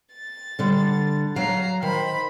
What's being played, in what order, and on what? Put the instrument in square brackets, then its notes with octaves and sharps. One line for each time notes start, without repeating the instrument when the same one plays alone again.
[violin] A6
[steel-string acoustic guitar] D3 G3
[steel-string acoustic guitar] F#3 F5 [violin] A#5 C7
[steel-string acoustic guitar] D#3 [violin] C5 B5